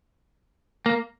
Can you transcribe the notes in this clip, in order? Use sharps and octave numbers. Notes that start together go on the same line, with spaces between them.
A#3